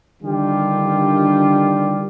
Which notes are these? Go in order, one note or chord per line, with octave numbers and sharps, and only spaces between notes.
D3 D#3 G3 D4 F4 G4